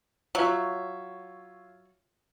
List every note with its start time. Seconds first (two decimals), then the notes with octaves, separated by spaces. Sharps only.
0.35 F#3 F4 C#5 E5